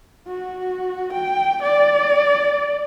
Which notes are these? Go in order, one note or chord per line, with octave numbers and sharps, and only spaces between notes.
F#4
G5
D5